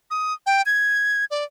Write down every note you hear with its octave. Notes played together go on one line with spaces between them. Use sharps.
D#6
G5
G#6
D5